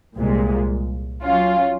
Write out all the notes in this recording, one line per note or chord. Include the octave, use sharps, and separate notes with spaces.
C2 A#2 G#3
F#3 C#4 F4